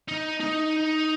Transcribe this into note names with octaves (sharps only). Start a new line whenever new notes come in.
D#4
D#4